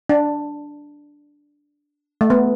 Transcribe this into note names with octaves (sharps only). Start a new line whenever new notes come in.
D4
A3
B3